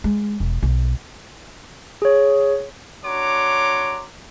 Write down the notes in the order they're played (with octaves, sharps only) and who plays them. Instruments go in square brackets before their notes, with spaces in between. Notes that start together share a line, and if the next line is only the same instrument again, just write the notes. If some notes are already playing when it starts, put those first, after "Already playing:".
[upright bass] G#3
E1
B1
[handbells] G#4 C#5
[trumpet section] D4 F#4 C#5 A#5 C6 D6